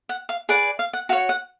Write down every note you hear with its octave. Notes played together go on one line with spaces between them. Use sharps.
F#5
F5
G#4 B4 D5 F#5
F5
F#5
F#4 C#5 F5
F#5